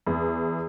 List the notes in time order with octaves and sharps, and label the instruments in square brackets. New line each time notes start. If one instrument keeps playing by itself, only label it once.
[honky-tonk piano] E2